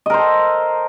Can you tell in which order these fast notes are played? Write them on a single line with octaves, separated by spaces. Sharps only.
D#5 A#4 C5 A4